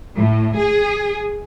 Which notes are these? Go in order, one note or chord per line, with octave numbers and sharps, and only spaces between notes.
A2
G#4